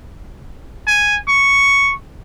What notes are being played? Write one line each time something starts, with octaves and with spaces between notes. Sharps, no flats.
G#5
C#6